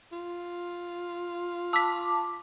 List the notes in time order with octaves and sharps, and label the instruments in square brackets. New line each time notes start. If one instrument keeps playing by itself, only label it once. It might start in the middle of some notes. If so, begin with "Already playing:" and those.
[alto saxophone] F4
[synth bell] A5 D6 [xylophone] E6 B6